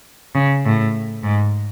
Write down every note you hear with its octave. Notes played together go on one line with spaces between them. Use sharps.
C#3
A2
G#2